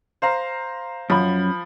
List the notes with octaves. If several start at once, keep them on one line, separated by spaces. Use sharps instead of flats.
C5 F5 A#5
F#2 F3 B5